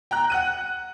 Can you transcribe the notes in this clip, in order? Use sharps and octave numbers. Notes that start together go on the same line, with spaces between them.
G5 A#5 F#6
F#5 F#6 D#7